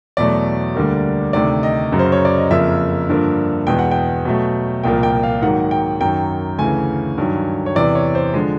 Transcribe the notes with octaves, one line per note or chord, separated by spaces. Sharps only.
E2 B2 F#3 A3 D5
D2 D3 G3 A#3
D2 C3 D#3 D5
D#5
F#2 C#3 F#3
C5
C#5
D5
D#5
F2 C#3 F3 A#3 E5
G2 D3 F3 A#3
E2 B2 G#3 B3 G5
F#5
G5
B2 F#3 A3
C2 A#2 F3 A#3 G5
G5
F5
G#2 D#3 F#3 A#3 F#5
G5
F#2 D#3 F#3 G5
D2 C#3 E3 G#5
G2 D#3 F#3
C#5
E2 C3 E3 D5
C#5
C5
D3 F3 G#3